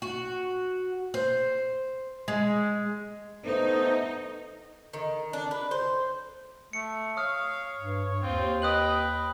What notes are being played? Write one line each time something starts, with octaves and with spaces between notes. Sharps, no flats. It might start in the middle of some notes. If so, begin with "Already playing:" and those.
F#4
C5
G#3
A3 B3 D#4 C5
D#3
D4
B4
C5
A3 C#7
C#5 F5 D#6 F6
G2
D#2 C4 F4
B4 D#5 G5 D#6 F#6 F#7